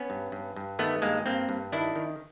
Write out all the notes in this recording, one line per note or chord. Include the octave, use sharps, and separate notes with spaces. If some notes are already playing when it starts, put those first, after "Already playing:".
Already playing: B3 C#4
G2
G2
G2
D#3 A3 B3
G2 G#3 A#3
G2 A#3 C4
G2
D#3 D4 E4
D#3